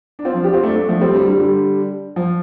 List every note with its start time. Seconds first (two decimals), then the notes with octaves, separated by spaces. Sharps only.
0.19 D4
0.25 C4 F4
0.34 F3
0.43 D4 G4
0.53 C4 F4
0.63 A3 D4
0.75 A3 D4
0.89 F3 A3
1.01 G3 C4
1.14 D3 G3
1.27 D3 G3
1.39 D3 G3
2.16 F3